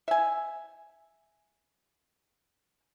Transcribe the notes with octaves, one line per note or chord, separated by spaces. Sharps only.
E5 G#5